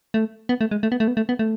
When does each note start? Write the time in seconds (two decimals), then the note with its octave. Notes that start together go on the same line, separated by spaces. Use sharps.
0.14 A3
0.49 B3
0.61 A3
0.71 G#3
0.83 A3
0.92 B3
1.00 A3
1.08 B3
1.17 A3
1.29 B3
1.39 A3